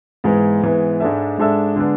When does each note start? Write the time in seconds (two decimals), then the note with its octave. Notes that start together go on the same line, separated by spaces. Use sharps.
0.24 G#2 E3 G#3 B3
0.62 G#2 E3 G#3 B3
1.00 G#2 G#3 D4 A4 E5
1.38 G#2 G#3 D4 A4 E5
1.76 D3 G#3 B3 D4